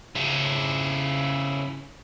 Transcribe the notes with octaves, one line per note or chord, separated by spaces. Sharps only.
C#3 E4